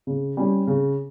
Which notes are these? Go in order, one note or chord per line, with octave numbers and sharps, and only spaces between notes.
C#3
G3 C#4 G4
C#3